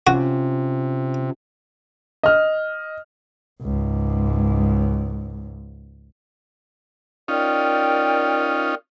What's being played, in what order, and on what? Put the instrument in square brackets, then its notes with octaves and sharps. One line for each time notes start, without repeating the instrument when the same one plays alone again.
[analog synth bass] C3 [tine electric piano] C#4 F4 [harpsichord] F#4
[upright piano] D#5 F6
[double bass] C#2 G#2
[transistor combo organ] C#4 D#4 F4 [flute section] A#4 D5 G5